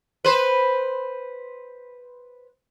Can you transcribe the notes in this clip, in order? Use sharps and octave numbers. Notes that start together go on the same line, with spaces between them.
B4 C5